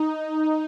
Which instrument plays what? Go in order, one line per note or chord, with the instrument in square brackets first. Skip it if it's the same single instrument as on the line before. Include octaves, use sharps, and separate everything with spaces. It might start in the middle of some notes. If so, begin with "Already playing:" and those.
Already playing: [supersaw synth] D#4